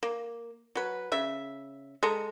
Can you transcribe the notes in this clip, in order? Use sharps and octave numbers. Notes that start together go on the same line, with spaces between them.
A#3
F#3 B4
C#3 E5
G#3 A4 A#5